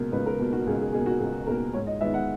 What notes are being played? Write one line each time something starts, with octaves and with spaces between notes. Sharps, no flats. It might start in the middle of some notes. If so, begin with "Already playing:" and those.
Already playing: C#2 B2 A#3
C#2 B4
A#4
B2 A#3
F#4
C#2 G#4
G#4
B2 A#3 G#4
F#4
C#2 G#4
B2 A#3 A#4
G#2 C#5
D#5
D#3 G#3 B3 E5
F#5